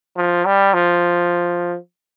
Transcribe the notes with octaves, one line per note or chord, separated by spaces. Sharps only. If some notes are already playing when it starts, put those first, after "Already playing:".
F3
G3
F3